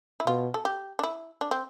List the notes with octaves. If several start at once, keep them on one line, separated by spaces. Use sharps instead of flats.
E4
B2 F4
A4
G4
D4
E4
D4
C4